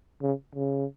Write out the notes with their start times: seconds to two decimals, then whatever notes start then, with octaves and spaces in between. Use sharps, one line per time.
0.22 C#3
0.55 C#3